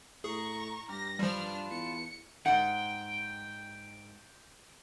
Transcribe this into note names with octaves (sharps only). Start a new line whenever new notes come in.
A2 G#4 A#5 C#6
G2 G4 A#5 F6 A#6
F3 G3 D4 F4 B4 A5 F6
E2 C#7
G#2 F#5 G5